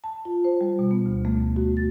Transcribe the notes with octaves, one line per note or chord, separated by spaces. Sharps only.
A5
F4
C5
G3
B2
B3
D2
A3
F#4
A6